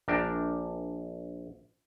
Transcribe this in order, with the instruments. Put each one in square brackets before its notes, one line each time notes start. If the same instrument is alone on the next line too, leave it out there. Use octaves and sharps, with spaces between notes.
[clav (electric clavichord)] A#1 D4 A#4 G5